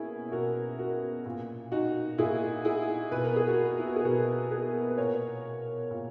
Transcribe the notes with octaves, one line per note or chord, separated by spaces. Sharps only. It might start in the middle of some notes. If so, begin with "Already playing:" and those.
Already playing: B2 A#3 C#4 E4 G#4
B2 F#4 A#4
F#4 A#4
A#2
D#4 F#4
A#2 E4 G#4
E4 G#4
B2 B4
A#4
G#4
F#4 A#4
E4
F#4
G#4
B2 F#4 A#4
G#4 B4
B4
A#2 A#4 C#5
A#2